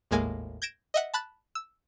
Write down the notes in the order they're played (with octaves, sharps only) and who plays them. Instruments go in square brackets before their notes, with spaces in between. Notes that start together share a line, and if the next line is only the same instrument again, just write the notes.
[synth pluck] G#1 D#2 A2 G#3 A#3 G#5
G6 G#6 A#6 D7 E7
D#5 E5 F#5
A5 B5 F#6 A6
E6